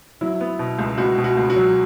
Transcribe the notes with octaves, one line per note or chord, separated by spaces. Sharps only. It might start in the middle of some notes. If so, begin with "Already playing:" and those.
F#3 E4
B3
B2
C#2
C#2 F#4
B2
F#4
C#2
F#4
F#3